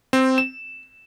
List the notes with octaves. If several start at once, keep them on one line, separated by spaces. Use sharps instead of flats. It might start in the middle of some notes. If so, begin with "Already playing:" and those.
C4
E7